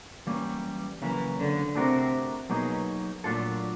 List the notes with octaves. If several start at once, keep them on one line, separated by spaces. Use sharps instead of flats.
E3 F#3 G3 A#3 C#4
C#3 E3 F#3 A#3
D3
C3 A3 D4 F#4 A#4
B2 F#3 A#3 D#4 G#4
A#2 F#3 A3 D4 F4 A4